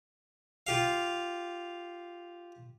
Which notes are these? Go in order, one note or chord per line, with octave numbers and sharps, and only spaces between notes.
F4 G4 F5